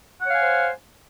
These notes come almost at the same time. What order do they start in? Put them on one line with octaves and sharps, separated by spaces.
F#5 C#5 F5 G#5 C5